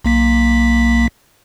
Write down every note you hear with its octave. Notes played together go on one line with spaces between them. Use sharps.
B1 A#3 B6